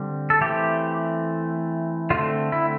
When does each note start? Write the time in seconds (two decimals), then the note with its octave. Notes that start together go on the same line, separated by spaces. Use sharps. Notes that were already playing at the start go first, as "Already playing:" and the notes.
Already playing: D3 G3 C4
0.30 A4
0.41 E3 A3 C4 G4
2.10 D3 A3 C4 F4
2.52 E4